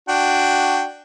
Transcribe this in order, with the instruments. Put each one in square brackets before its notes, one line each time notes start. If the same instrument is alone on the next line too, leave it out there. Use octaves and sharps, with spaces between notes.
[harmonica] D4 F#4 G5